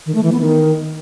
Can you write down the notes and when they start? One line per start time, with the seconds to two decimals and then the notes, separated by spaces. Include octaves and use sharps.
0.06 D#3
0.15 A3
0.23 E3
0.32 B3
0.41 D#3